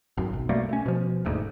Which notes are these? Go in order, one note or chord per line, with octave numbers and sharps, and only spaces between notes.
G#1 F#2
B1
B2 G3 A3 A#3
A3 C#4
B2 F3
D#1 D2 G#2